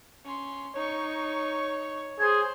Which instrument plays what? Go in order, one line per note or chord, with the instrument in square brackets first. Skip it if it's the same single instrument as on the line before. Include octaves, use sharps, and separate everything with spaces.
[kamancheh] C#4 C6
[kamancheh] D#4 C#6 [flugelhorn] C#5
[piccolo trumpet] G#4 [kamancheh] C5 [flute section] G#6